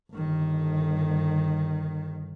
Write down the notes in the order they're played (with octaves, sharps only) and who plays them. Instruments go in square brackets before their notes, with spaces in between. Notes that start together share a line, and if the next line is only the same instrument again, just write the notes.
[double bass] G1 D#3